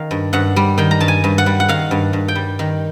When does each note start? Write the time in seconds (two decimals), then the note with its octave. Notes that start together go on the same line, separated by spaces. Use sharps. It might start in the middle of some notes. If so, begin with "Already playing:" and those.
Already playing: D#3 F5
0.11 G2
0.33 G2 F#5
0.56 G3
0.78 D#3 G5
0.91 A#5
1.00 G2 A5
1.08 G#5
1.24 G2
1.38 F#5
1.46 G3
1.60 F#5
1.69 D#3 F5
1.91 G2
2.13 G2
2.28 G5
2.35 G3
2.59 D#3